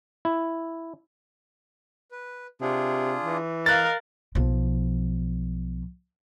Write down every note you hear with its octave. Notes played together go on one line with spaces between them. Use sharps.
E4
B4
C3 D4 F4 G#4
E3
A#4 D#5 F5 F#6 A6
B1 F3